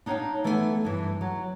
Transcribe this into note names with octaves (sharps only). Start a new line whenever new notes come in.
D4 D#4 C#5 D#5 F5 G5
E3 A3 B3 A4 D#5 G#5
G2 E3
F#3